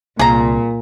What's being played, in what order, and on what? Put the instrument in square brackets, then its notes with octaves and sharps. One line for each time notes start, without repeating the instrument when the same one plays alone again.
[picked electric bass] C2 [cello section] A#2 [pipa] G#4 A#5